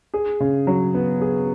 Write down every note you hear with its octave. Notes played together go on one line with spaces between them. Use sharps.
G#4
C#3
F#3
B3
G#4